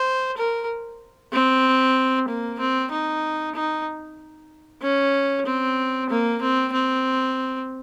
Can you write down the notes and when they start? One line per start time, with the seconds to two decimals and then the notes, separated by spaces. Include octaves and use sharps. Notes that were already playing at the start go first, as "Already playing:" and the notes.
Already playing: C5
0.37 A#4
1.33 C4
2.28 A#3
2.60 C4
2.92 D#4
3.55 D#4
4.82 C#4
5.46 C4
6.10 A#3
6.42 C4
6.73 C4